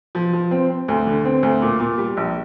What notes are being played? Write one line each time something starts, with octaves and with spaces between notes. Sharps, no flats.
F3
F3
C4
C4
D2
D3
C4
D2
A#2
A#2
G3
A#1